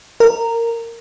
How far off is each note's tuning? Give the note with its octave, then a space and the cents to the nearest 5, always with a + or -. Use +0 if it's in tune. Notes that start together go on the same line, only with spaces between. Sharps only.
A#4 -15